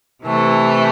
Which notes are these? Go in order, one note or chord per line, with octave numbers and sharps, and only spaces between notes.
C3 E3 A3